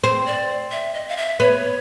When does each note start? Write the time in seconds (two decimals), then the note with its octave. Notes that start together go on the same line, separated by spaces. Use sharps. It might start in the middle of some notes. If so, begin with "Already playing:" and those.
0.04 C4 C5
0.26 D5
0.71 E5
0.94 D#5
1.09 F5
1.17 E5
1.40 B3 C#5